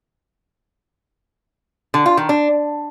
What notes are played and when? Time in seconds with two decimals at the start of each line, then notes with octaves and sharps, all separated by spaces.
1.94 D3
2.06 F4
2.17 D#3
2.29 D4